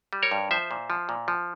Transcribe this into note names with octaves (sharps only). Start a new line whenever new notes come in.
G3
A#4 C#5
G2
F3 C5 E5
A#2
F3
A#2
F3